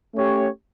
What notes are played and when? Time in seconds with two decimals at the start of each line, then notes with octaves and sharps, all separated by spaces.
0.14 A3 C#4 G4 C#5